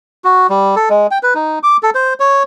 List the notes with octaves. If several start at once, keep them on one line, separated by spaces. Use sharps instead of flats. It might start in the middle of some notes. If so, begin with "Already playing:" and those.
F#4
G3
A4
G#3
G5
B4
D#4
D6
A4
C5
C#5